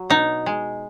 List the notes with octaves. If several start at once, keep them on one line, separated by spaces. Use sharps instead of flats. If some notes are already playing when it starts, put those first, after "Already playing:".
Already playing: F#3
B2 D#4
G#3